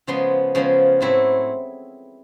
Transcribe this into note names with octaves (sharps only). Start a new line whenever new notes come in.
C#3 F3 G#3 B3 C6
C#3 F3 G#3 B3
A2 F#3 A3 C4 E4